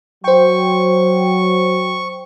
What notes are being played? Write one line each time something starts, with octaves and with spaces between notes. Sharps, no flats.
F#3 C5 G5 C#6